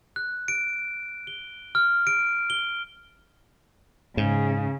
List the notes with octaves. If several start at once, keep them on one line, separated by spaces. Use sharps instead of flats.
F#6
D7
G7
F6
D7
G7
G#2 C#3